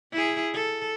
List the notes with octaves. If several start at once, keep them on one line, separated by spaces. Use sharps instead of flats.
E4 G#4
A4